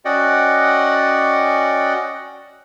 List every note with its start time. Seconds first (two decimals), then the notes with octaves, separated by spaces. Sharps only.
0.05 C#4 F#4 D5 D#5 F#5 G5